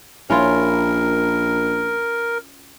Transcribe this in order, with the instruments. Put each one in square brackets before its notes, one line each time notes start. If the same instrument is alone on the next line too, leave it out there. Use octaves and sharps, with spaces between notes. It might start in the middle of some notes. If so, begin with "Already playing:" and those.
[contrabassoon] A#1 [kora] C#4 E4 F4 [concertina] A#4